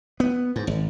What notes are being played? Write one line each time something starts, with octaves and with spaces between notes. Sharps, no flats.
B3
G#2
G#1